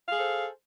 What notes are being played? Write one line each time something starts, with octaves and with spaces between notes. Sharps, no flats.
G#4 A4 C5 F5